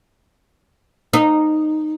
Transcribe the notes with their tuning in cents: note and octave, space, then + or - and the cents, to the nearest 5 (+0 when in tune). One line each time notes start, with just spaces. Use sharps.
D#4 -10